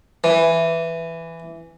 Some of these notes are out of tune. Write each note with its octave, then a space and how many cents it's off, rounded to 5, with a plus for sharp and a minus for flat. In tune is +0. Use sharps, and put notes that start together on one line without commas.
E3 +5